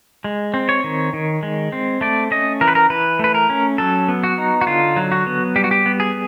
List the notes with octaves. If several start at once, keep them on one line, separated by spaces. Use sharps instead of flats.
G#3
C4
C#5
D#3
D#3
G#3
C4
A3 D5
C#4 D#5
E3 A#4
B4
A#4
E3 B4
A3 B4
A#4
C#4
F#3 A4
B3
F#4
D#4
F#4
D3 F4
F#3
F#4
B3
G3 G4
F#4
G4
B3
G#4